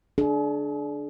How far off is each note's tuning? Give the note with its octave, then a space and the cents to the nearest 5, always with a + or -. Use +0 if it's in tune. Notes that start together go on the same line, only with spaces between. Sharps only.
D4 +0 G#4 +45